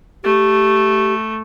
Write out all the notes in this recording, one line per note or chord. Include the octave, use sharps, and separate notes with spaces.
A3 G4